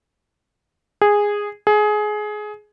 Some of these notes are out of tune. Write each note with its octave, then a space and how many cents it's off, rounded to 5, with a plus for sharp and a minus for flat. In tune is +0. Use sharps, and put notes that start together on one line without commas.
G#4 -10
G#4 +20